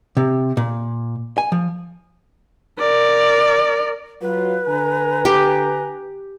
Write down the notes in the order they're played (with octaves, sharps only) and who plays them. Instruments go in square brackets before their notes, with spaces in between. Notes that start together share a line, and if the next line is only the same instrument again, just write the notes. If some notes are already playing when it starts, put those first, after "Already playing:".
[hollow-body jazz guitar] C3
A#2
G#5
F3
[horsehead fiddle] A#4 D5
[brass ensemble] F#3 F4 [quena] B4
[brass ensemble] D3 G#5 A#5
[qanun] G4